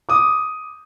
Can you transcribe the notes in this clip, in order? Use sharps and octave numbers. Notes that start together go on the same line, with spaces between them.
D6 D#6